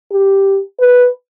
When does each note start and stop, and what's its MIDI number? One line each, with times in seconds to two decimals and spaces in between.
0.11 0.59 67
0.80 1.09 71